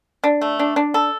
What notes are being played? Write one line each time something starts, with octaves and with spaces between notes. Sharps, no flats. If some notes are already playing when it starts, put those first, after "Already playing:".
D4
A3
D4
D4
A4